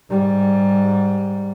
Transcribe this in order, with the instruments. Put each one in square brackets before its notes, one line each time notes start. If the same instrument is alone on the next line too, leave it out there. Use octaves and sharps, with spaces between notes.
[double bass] G#2 G3